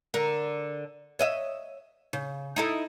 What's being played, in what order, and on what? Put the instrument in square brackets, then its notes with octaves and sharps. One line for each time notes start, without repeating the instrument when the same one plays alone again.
[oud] D3 A#4
C#5 D#5 E5
C#3
D#4 E4 A4